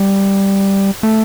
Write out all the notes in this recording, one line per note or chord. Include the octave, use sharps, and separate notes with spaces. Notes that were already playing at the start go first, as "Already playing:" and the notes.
Already playing: G3
A3